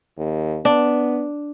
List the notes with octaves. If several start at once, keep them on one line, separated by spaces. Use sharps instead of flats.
D#2
B3 D4